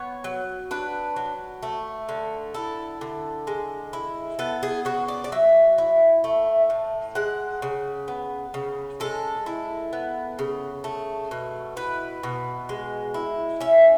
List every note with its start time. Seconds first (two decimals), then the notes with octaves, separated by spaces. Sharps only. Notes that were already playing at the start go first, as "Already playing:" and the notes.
Already playing: B3 C#5
0.24 F#3
0.71 D4 B4
1.16 F#3
1.63 A3
2.09 D3
2.54 E4 A4
3.01 D3
3.47 G#3
3.93 E4
4.39 B3 A4
4.63 G#4
4.85 C#3 F#4
5.08 D5
5.24 D5
5.32 F#3 E5
5.78 E4
6.24 A3
6.70 A2
7.15 G#3 F#5
7.62 C#3
8.08 B3
8.54 C#3
9.00 G#3 A4
9.46 E4
9.93 B3
10.39 C#3
10.84 A3
11.31 B2
11.76 E4 B4
12.23 B2
12.69 G#3
13.14 E4
13.60 C#4 E5